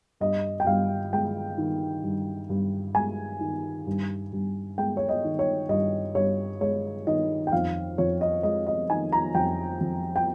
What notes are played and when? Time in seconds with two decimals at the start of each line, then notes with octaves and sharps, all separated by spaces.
0.20 G2 D#5
0.60 G5
0.67 G2 F5
1.13 G#3 G5
1.58 D#3
2.03 G2
2.50 G2
2.95 G#3 G#5
3.40 D#3
3.87 G2
4.32 G2
4.78 G#3 G5
4.97 C#5
5.09 D#5
5.24 D#3
5.39 C#5
5.69 G2 D#5
6.15 G2 C#5
6.61 G#3 C#5
7.07 D#3 D#5
7.47 G5
7.52 F2 F5
7.98 F2 C#5
8.21 D#5
8.43 G#3 D#5
8.67 D#5
8.90 D#3 G#5
9.12 A#5
9.35 F2 G5
9.81 F2
10.16 G5